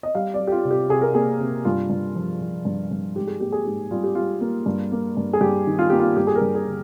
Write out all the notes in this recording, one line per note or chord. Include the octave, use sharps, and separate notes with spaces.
D#5
G3 F5
D5
G3
G4
F4
C3
G4
C3 G#4
A#4
A#3 G#4
C3
G2 F4
G2
F3
F3
G2
G2
G#2 G4
G#4
A#3 G4
G#4
G#2 G4
G3 F4
G4
G3 F4
A#3
G2
A#3
G2
G#4
G2 G4
D#3
F4
A#3 G4
F4
G2 G4
G#4
A#4
G2
G#4
D3